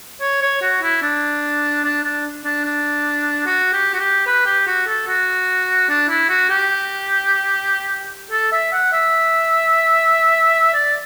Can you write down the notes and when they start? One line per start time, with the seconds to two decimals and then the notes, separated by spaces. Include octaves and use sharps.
0.21 C#5
0.42 C#5
0.62 F#4
0.83 E4
1.02 D4
1.84 D4
2.04 D4
2.44 D4
2.64 D4
3.46 F#4
3.73 G4
3.94 F#4
3.99 G4
4.26 B4
4.46 G4
4.67 F#4
4.87 A4
5.08 F#4
5.89 D4
6.09 E4
6.29 F#4
6.50 G4
8.31 A4
8.52 E5
8.72 F#5
8.92 E5
10.74 D5